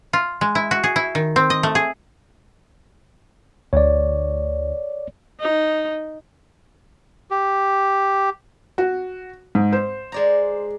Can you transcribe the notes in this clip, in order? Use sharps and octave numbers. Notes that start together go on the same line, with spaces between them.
F4
G#3
E4
F#4
G#4
E4
D#3
C4
D#5
A3
G#4
D2 C#5 D5
D#4
G4
F#4
G#2
C5
G#3 D5 A#5